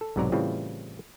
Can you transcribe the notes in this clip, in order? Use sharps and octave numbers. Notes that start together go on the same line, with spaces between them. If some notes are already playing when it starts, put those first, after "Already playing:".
A4
B1 G#2 C3 F#3 D5 A#5
A2 C#3 E3 G3 C4 F4